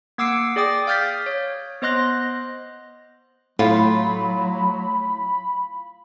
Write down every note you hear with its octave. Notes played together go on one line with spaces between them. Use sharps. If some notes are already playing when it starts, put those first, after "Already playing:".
A#3 F#5 D6 E6 C7 D7
G#4 D5 G5 D6 D#6
F5 D#6 F6 G6 A6 B6
C#5
B3 C5 D#5 C6 F#6 A#6
A2 F#3 F4 B5